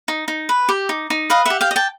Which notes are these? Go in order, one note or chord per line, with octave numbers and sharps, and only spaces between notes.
D#4
D#4
B4
G4
D#4
D#4
B4 D#5 F5
G4 E5 F#5
F5 G5
D#5
G5 A5